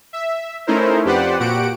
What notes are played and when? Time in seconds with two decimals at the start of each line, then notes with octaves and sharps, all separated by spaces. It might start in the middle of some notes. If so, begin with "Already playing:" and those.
0.13 E5
0.67 A3 C#4 D#4 E4 A#4 C5
1.05 F2 G4 B4 C5 D5 F#5
1.40 A#2 F#4 G4 F#5 D7